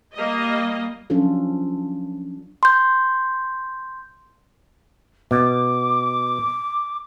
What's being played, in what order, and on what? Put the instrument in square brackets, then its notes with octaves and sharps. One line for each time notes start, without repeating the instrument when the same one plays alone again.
[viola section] G3 A#3 D#5
[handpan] F3 F#3 C#4 D4 F4 A4
[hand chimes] C6 G6
[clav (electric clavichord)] B2 [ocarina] D6